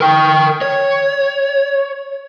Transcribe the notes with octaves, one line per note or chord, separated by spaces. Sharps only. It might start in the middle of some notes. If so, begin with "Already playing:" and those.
A#4 G5
C#5